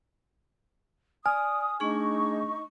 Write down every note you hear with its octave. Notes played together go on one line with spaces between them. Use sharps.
D5 G#5 D#6 F6
A3 D4 D#4 G#4 C#6